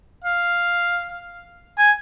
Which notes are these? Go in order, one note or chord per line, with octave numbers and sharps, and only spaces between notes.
F5
G#5